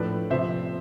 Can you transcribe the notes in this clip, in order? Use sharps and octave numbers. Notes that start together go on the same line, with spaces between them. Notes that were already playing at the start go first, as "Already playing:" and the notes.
Already playing: A2 F3 A3 D4 B4 D5
C3 F3 C4 C5 E5